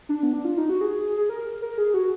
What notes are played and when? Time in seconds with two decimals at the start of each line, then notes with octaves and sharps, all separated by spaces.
0.09 D4
0.23 B3
0.33 D4
0.45 F4
0.57 D#4
0.69 F#4
0.81 G#4
1.17 G#4
1.29 A#4
1.62 A#4
1.78 G#4
1.94 F#4